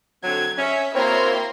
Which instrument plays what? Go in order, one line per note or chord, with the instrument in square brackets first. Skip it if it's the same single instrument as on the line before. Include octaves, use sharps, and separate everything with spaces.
[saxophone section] D3 F#3 C4 [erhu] G#6
[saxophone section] C#4 [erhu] E5
[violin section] A#3 A#5 C6 [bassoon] C4 [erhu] E4 [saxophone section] F#4 A#4 C#5